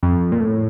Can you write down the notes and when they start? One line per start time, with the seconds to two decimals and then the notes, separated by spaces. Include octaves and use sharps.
0.03 F2
0.32 A#2
0.40 A2